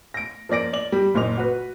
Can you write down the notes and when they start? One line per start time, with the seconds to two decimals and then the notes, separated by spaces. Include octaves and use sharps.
0.14 A#6 D7
0.49 F3 A#3 D5 A#6 D7
0.73 D5 F#7
0.92 G3
1.14 F#1 A#2 D#5 F7
1.38 F#4 B4